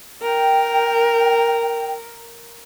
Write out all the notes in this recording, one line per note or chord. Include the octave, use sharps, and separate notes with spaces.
A#4 G5